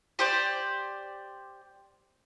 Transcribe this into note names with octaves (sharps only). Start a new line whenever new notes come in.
G4 C5 D5